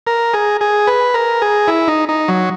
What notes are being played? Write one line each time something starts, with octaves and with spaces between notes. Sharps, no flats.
A#4
G#4
G#4
B4
A#4
G#4
E4
D#4
D#4
F#3